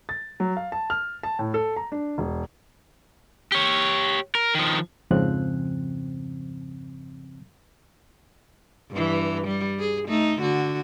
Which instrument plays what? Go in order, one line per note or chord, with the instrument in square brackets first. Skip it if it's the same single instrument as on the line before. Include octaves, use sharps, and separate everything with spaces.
[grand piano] A6
F#3
F5
A5
F6
A5
A2
A4
A#5
D4
E1
[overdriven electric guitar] G4 C#5
A#4
D#3 F3
[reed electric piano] F2 G#2 C#3 F3 C4 F#6
[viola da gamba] G2 E3
G3
G#4
A3 D#4
D3 F#4